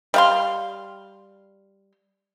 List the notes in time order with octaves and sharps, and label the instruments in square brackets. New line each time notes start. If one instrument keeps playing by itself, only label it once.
[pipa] G3 F5 C6